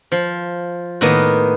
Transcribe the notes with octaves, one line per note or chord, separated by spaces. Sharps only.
F3
A2 D#3 A#3 B3 A#4 D#5